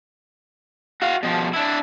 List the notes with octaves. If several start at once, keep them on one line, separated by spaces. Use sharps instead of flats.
F#4 F5
B2 F3
D4 E4